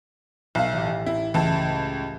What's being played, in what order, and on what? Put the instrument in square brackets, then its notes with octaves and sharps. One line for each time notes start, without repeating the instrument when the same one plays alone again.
[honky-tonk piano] B1 F5 [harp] E5
[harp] A1 G4
[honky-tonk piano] E4
[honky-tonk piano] C#2 A5 [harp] E3 A3